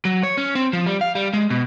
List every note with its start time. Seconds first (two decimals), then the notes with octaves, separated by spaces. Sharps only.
0.05 F#3
0.23 C#5
0.38 C#4
0.55 C4
0.73 F3
0.86 G3
1.01 F5
1.15 G3
1.33 G#3
1.50 B2